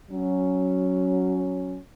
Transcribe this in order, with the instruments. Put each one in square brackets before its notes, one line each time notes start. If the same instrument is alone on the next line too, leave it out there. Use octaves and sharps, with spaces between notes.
[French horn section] F#3 C#4